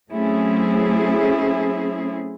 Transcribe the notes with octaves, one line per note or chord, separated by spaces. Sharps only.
F#3 A3 C4 C#4 E4 G#4